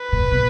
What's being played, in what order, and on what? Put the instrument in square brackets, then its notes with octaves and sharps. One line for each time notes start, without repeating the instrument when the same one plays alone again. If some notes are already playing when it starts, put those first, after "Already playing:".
Already playing: [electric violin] B4
[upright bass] A#2
B2